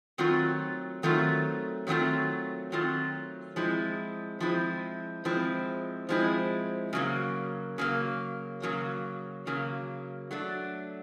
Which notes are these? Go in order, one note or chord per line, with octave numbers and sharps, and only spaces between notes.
D#3 F#3 A3 C4 F4
D#3 F#3 A3 C4 F4
D#3 F#3 A3 C4 F4
D#3 F#3 A3 C4 F4
F3 G#3 C4 E4
F3 G#3 C4 E4
F3 G#3 C4 E4
F3 G#3 C4 E4
C#3 F#3 A#3
C#3 F#3 A#3
C#3 F#3 A#3
C#3 F#3 A#3
F#3 A3 D4